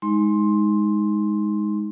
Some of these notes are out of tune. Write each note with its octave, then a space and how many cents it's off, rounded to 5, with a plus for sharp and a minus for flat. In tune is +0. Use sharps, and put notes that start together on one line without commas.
G#3 +0 D#4 +15 C6 +10